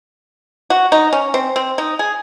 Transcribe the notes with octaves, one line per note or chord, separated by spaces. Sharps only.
F#4
D#4
C#4
C4
C4
D#4
G#4